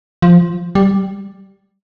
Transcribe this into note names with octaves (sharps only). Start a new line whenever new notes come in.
F3
G3